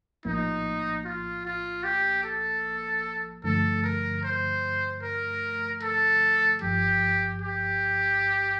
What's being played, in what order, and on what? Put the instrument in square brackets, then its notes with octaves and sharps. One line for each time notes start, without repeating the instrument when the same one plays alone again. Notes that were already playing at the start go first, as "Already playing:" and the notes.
[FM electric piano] A#1 A2 F3 A#3 [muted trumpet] D#4
[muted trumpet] F4
F4
G4
A4
[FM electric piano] G2 D3 F3 A3 [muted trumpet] A4
[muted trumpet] A#4
C5
A#4
A4
[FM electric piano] G1 G2 F3 [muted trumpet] G4
[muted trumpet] G4